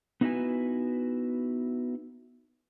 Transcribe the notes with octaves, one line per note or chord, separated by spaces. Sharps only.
B3 D#4 E4 F#4 B4 G#5